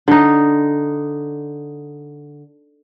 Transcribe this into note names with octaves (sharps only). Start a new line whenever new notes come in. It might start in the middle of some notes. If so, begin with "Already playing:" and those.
D3 D#4